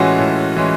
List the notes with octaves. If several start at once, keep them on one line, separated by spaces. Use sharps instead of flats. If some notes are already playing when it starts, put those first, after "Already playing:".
Already playing: A2 E3 G#3 C#4 F4 F#4
A2
E3 G#3 C#4